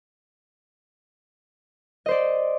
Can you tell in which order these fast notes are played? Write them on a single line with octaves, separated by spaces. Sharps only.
D#5 C5 D5